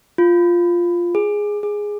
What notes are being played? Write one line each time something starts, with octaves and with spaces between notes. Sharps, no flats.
F4
G#4
G#4